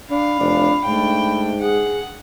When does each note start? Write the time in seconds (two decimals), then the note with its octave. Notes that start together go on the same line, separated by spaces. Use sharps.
0.10 D4 F5 B5
0.39 F1 D4
0.85 G#2 A3 D4 G5
1.61 G#4 F#5